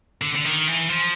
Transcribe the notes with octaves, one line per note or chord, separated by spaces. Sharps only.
D3
D3
D#3
E3
F3